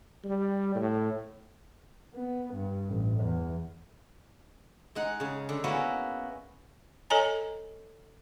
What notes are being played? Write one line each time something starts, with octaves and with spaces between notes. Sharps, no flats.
G3
A2
B3
G2
A1
E2
G#3 D#4 F#5
C#3 G#4
D3
A#3 B3 C#4 E4 F#4
A4 C#5 D#5 G#5 A#5